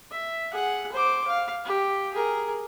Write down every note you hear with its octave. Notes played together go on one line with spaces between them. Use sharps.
E5
G#4 F#5
C5 D6
F5
G4
G#4 A#4